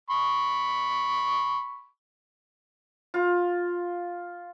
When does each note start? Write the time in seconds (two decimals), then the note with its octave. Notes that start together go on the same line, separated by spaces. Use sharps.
0.10 B5 C#6
3.14 F4